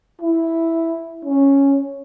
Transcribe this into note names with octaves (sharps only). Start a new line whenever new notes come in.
E4
C#4